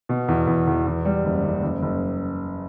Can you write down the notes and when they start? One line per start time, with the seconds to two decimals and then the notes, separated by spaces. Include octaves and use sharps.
0.09 B2
0.28 E2
0.47 E2
0.67 E2
0.87 E2
1.05 G3
1.25 F#1
1.44 F#1
1.62 F#1
1.82 F#1